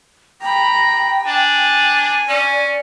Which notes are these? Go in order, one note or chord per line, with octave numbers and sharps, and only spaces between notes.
G5 A#5 B5
D4 G#5
C#4 D5